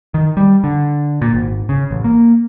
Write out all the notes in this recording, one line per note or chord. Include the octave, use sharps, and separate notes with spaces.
D#3
G3
D3
A#2
G#1
C#3
A1
A#3